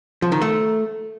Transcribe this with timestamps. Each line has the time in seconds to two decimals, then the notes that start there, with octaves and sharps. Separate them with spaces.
0.22 F3
0.32 D#3
0.42 A3